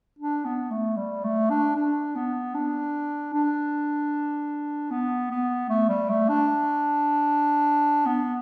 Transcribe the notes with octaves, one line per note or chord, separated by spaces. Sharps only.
D4
B3
A3
G3
A3
D4
D4
B3
D4
D4
B3
B3
A3
G3
A3
D4
B3